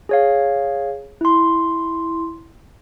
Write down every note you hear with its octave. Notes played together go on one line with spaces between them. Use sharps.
G#4 C#5 F5
E4 C6